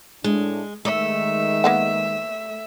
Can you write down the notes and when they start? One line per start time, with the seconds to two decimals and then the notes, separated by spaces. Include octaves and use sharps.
0.24 A2 G#3 A3 D4
0.85 D#3 G#3 A3 E5
1.64 A#3 B3 F#5